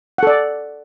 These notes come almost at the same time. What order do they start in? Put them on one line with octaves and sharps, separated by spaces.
F#5 A4 D5